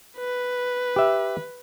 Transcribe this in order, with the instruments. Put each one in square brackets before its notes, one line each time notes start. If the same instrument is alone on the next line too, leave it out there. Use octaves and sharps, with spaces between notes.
[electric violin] B4
[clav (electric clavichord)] G4 E5